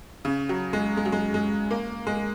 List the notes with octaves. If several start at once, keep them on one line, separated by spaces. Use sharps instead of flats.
C#3
F#3
G#3
G#3
F#3
G#3
G#3
A#3
G#3